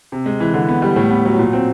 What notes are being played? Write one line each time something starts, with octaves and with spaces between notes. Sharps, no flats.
C3
G#3
E3
D3
B3
G3
A2
B3
F#3
A#2
C4